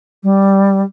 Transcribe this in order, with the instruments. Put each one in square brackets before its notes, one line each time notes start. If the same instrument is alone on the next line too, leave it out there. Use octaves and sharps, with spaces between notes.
[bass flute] G3